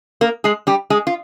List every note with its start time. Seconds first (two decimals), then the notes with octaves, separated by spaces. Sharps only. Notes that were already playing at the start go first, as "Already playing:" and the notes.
0.21 A#3 A#4
0.44 G#3 G#4
0.67 G3 G4
0.90 G#3 G#4
1.07 F4